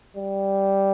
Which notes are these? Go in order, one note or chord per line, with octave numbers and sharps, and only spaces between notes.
G3